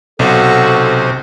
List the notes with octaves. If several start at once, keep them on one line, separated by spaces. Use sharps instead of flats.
B1 C3 F#4 A4